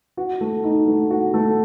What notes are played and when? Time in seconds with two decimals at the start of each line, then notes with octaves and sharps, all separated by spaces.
0.17 F#4
0.41 A3
0.64 D#4
0.87 A3
1.10 F#4
1.34 A3